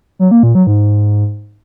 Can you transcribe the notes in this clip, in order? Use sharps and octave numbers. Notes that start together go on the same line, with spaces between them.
F#3
A#3
A#2
F#3
G#2